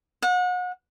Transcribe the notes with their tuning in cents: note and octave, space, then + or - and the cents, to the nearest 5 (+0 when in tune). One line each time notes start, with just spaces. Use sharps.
F#5 -35